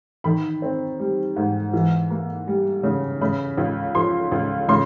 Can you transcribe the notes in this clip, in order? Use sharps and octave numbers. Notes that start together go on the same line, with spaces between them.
D#3 B5
C4
G3
G#2
E3
A#3
G3
C#3
C#3 B5
C#2
F3 C6
C#2
C#3 C6